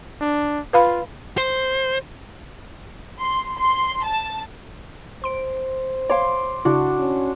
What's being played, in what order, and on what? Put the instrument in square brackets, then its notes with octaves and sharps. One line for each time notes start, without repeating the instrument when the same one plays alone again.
[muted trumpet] D4
[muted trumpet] F4 [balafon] B4 F5 B5
[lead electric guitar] C5
[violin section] C6
C6
A5
[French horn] C5 [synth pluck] C6 D7
[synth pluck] C#5 F5 [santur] C6 D6
[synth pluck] C#3 E4 [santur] D4 F#4
[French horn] C#4